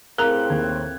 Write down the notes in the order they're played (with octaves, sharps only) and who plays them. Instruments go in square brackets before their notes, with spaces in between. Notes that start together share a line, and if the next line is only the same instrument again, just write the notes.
[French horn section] A2 C4 [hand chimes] G#4 F5 [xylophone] A#4 A#5 [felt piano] F#6
[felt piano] D#2 [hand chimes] G#6